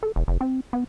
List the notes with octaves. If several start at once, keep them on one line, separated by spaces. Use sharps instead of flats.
A4
E1
F1
C4
B3